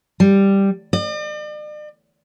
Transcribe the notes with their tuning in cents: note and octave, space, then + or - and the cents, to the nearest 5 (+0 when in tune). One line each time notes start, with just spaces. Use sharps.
G3 +5
D5 +45